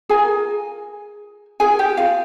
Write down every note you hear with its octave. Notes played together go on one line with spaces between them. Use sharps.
F4 G#4 A#4 G#5
F4 G#4 A#4 G#5
G4 G5
F4 F5